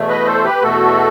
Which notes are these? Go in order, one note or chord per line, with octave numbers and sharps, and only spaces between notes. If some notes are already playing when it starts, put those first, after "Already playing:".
Already playing: E2 B2 A3
B4 D#5
A4 C5
G4 B4
E2 B2 A3 F#4 A4